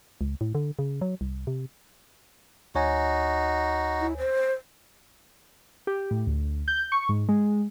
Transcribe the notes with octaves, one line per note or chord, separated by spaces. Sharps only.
C#2
A2
D3
C#3
F#3
C2
C3
D2 D#4 F#4 C#5 G#5
E4
C5
G4
A2
D2
G6
C#6
G#2
G#3